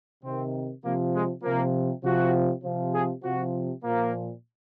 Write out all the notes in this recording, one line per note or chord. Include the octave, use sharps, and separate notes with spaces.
C3 D#3 C4
C3 F3 A#3
G#3
C3 F3 A#3
C3 F3 F#4
C3 F3
G#4
C3 F3 F#4
A#2 F3 A#3